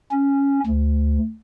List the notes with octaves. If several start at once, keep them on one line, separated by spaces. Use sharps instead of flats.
C#4
D2